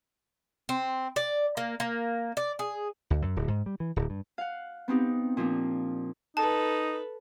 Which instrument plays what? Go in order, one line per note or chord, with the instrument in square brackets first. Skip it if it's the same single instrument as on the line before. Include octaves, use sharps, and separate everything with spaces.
[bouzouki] C4
D5
A#3
A#3
D5
G#4
[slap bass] D2
F#2
D1
G#2
G3
E3
D1
G2
[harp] F5 F#5
B3 C4 D#4 G4
A#2 F3 A#3 D4
[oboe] D#4 [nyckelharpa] A4 B4 [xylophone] A5